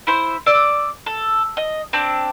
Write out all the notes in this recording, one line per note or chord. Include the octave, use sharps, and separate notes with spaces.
E4 C5
D5 D6 E6
A4
D#5
C4 D4